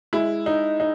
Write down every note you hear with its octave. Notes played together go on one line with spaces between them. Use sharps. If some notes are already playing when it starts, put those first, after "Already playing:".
G#3 E4
D#4
D#4